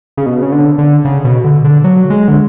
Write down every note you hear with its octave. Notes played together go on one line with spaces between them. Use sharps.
C#3
B2
C#3
D3
D3
C#3
B2
D3
D3
F#3
G#3
D3